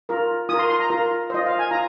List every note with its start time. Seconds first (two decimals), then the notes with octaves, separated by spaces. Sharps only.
0.09 F4 A#4
0.49 F4 D#6
0.54 A#4
0.59 C6
0.70 C6
0.80 A#5
0.90 F4 A#4
1.30 F4 C5 D#5
1.46 F5
1.59 G#5
1.71 F4 A#5